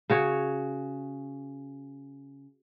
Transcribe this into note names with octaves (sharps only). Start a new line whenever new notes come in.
C#3 F#4 C#5